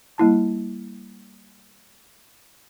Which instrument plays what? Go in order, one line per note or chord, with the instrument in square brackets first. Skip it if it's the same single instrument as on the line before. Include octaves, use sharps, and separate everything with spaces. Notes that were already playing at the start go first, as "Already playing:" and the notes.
[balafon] G3 A#3 E4 A5